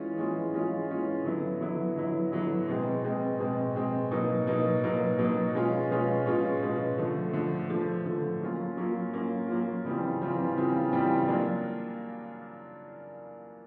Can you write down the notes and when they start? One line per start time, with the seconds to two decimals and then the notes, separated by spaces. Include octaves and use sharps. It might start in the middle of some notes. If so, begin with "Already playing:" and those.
Already playing: E3 G#3 C#4 F4
0.17 E3 G#3 C#4 F4
0.53 E3 G#3 C#4 F4
0.89 E3 G#3 C#4 F4
1.24 D3 F#3 B3 E4
1.61 D3 F#3 B3 E4
1.96 D3 F#3 B3 E4
2.32 D3 F#3 B3 E4
2.68 B2 G#3 C4
3.04 B2 G#3 C4
3.39 B2 G#3 C4
3.76 B2 G#3 C4
4.11 B2 F#3 A#3 D#4
4.47 B2 F#3 A#3 D#4
4.83 B2 F#3 A#3 D#4
5.19 B2 F#3 A#3 D#4
5.54 B2 G#3 C#4 F4
5.90 B2 G#3 C#4 F4
6.26 B2 G#3 C#4 F4
6.62 B2 G#3 C#4 F4
6.98 D3 F3 A3
7.33 D3 F3 A3
7.70 D3 F3 A3
8.05 D3 F3 A3
8.41 F#3 A#3 C#4 F4
8.77 F#3 A#3 C#4 F4
9.13 F#3 A#3 C#4 F4
9.48 F#3 A#3 C#4 F4
9.85 C#3 E3 G3 C4 F4
10.21 C#3 E3 G3 C4 F4
10.56 C#3 E3 G3 C4 F4
10.92 C#3 E3 G3 C4 F4
11.28 F#3 A#3 D4 F4